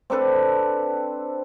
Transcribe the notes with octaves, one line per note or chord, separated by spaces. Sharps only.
C4 D4 A4 B4